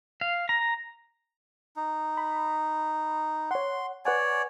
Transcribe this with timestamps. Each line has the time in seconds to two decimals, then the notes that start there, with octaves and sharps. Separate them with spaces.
0.21 F5
0.49 A#5
1.76 D#4
2.17 B5
3.51 C#5 F#5 C6
4.05 B4 C#5 D5 F#5 G#5